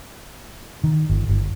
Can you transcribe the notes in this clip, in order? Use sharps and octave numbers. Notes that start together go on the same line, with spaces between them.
D#3
G1
G1